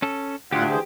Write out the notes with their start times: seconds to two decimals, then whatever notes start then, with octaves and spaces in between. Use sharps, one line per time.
0.02 C#4 A4
0.52 D2 A2 F4 G4 F#5
0.70 E3 G#4 C5